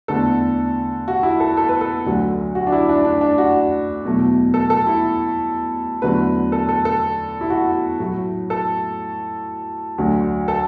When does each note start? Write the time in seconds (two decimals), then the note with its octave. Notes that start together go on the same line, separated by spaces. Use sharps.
0.08 E2 D3 A3 A4
1.08 F#4
1.23 E4
1.40 A4
1.57 A4
1.69 B4
1.81 A4
2.06 D2 D3 F#3
2.55 F#4
2.67 D4
2.72 E4
2.89 D4
3.05 D4
3.21 D4
3.38 F#4
4.05 E2 B2 F#3 A3
4.54 A4
4.70 A4
4.87 E4
6.02 E2 D3 F#3 A3 B4
6.52 A4
6.69 A4
6.85 A4
7.41 E4
7.50 F#4
8.00 A2 F#3 A3
8.50 A4
9.98 D2 D3 F#3
10.48 A4